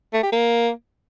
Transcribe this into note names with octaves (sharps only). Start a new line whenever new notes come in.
A3
G4
A#3